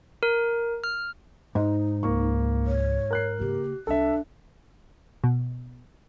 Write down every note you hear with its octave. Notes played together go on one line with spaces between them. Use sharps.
A#4
F6
G#2 D#4
C#2 A#3 C#6
C#5
A#4 F#6 C7
C#3 A#3 G4
C2 D4 A4 E5
B2